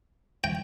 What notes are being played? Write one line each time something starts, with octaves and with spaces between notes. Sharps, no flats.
G5